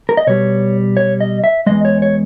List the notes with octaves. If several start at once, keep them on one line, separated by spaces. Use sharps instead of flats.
A#4
D#5
B2 G3 C#5
C#5
D#5
E5
E2 D#3 G#3 D#5
C#5
C#5